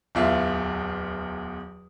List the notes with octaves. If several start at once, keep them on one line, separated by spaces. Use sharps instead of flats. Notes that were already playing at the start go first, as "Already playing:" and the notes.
D1 E2 F4 E5